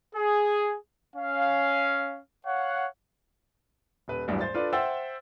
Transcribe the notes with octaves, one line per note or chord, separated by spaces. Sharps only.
G#4
C#4 F5
C#5 F5 F#5
D#1 B4
A1 E2 G2 F#3
C5 A6
D4 F4 A4 B4 D5
C5 E5 F#5 G5 E6 A6